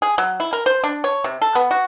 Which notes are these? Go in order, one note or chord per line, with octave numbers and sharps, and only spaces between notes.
G#4
F#3
E4
A#4
C5
D4
C#5
C3
A4
B3
F#4